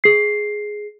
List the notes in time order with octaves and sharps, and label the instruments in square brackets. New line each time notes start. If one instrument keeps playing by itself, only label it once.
[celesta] G#4 C7